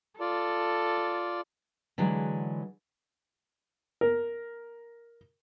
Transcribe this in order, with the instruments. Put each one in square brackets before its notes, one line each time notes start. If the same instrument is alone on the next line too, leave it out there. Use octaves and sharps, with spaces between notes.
[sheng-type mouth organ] F4 D5 [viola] A4
[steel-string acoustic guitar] D3 E3 F#3 G#3
[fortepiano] A#4